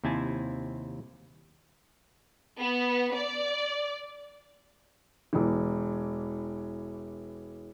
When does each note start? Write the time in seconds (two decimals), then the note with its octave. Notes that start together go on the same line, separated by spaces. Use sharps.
0.04 D#2 C3 C4 E4 G#5 A5
2.58 B3
3.15 D5
5.33 E1 E3